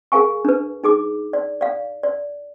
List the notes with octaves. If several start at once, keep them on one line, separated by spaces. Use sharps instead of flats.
G#4 A#4 F5 G#5 C#6
D4 B4
D#4 G#4 D6
D5
D5 F5
D5